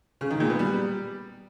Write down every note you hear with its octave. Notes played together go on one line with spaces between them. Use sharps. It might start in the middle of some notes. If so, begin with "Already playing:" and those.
C#3
D#3
A#2
B3
G3